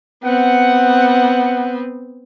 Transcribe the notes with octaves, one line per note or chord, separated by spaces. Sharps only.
B3 C4 F#5